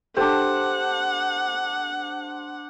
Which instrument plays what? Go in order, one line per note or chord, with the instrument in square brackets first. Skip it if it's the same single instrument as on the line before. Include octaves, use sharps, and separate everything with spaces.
[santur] D4 C5 [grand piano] G4 A4 [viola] F#5